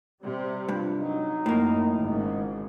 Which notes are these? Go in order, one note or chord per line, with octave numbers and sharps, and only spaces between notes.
C3 G3 C4
G2 F4
F#3 D#4
F#2 A2 A#3
G#1 G#2 C#3